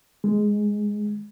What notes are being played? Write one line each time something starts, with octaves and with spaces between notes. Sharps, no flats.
G#3